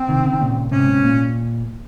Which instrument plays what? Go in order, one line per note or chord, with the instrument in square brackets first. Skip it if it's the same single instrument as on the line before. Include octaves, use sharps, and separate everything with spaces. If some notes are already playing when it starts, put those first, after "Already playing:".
Already playing: [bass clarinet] C4
[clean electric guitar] C3 D#3
C#3
D#3
A#2 C#3
[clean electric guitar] G#2 C3 [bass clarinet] C#4
[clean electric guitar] C3
A#2